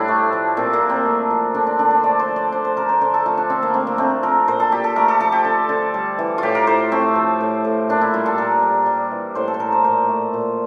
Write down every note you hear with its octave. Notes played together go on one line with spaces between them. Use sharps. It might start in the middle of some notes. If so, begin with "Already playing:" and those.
Already playing: A2 G3 C4 D4 E4
A3
F3
A#2 C4
A#3
A#2
C4
A3
F3
D3 D4
D4
D3 D4
C5
A3 D5
C5
F3
D5
D3 C5
C5
D3 A#4
C5
D3 C5
A4
A3 F4
D4
D3 C4
A#3
A3 C4
A#3
A3 C4
F3 A#4
A#2 C5
A4
A#2 G4
A4
A3 A#4
A4
F3 A4
G4
D3
D3
G3
E3
A2 F4 G4
A#4
A2 C5
A3 C4
F3
A2
A2
A#2 D4
E4
G3 F4
A4
A#2 A#4
G3
G3
E3
A2 C5
A4
C5
A2 A#4
C5
A#2 C5
A3
A#2